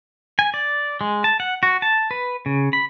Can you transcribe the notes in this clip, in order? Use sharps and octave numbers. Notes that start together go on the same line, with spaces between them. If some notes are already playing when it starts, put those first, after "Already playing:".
G#5
D5
G#3
A5
F#5
F#4
A5
B4
C#3
B5